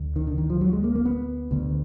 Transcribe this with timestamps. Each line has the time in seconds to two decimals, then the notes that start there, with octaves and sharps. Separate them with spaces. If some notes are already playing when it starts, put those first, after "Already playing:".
Already playing: D2
0.16 D#3
0.27 D3
0.38 D#3
0.50 F3
0.61 F#3
0.73 G#3
0.84 A#3
0.95 A#3
1.05 B3
1.51 D2 D3